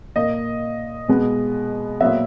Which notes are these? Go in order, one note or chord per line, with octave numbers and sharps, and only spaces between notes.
A#2 A#3 D#5
B2 G#3 B3
A#2 F#3 B3 E5